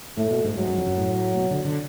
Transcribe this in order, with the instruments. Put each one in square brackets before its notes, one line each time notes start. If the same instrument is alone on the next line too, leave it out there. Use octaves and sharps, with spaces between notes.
[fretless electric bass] A2 [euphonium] A3
[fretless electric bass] B2
G#2
[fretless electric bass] G#2 [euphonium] F#3
[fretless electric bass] F#2
F2
F#2
A2
B2
D3
D3